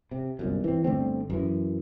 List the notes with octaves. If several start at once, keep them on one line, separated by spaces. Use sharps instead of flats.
C3
G1 C2 F#2
E3 C4
G1 D3 A3 C4
F#2 E3